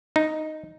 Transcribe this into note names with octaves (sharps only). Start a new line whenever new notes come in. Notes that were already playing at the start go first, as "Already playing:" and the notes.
D#4